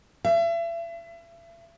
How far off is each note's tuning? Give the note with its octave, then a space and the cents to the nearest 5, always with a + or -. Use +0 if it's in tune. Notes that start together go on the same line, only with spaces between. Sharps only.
E5 +35